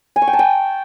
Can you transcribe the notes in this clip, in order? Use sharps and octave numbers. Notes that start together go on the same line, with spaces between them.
G#5
C#6
G5
A5
G5